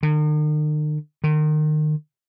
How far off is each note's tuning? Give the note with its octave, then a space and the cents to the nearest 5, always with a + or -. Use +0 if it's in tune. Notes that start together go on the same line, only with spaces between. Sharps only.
D#3 -45
D#3 -30